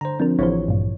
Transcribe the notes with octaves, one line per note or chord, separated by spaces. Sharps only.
D3 C5 A#5
F3 C4 D4 A#4
A1 E3 F3 E4 C5 C#5
G2 A#2